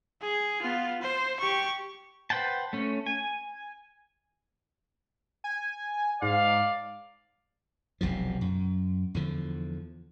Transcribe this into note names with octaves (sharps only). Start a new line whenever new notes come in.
G#4
B3 F4
C5
G4 C#6
B4 C5 F#5 G5 A5
A3 C#4
G#5
G#5
G#2 D5 F5
E1 B1 C3 F3
F#2
E2 D3 F3